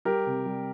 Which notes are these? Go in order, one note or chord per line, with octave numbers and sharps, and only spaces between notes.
G3 G4 A#4
C3
G3